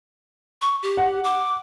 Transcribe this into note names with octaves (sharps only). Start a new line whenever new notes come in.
C#6
G4
F#5
D6